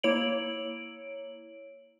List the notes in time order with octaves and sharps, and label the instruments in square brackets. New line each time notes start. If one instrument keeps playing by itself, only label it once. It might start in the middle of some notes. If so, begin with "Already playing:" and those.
[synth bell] A#3 E4 C#5 D7 F#7